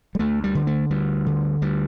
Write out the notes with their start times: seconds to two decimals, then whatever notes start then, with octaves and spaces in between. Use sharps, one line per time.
0.15 G3
0.19 D2 A3
0.44 G3
0.55 D3
0.67 A3
0.90 D2 G3
1.26 D3
1.62 D2 G3